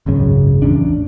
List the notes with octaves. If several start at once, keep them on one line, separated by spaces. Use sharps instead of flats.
G#1 C#2 F#2 C#3
A1 E2 C#4 D4